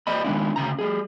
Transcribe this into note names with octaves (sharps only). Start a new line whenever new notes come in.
G4 C5 D5 D#5 B5
D#3 G#3 D4 E4
D2 C#3 A#5
G3 G#4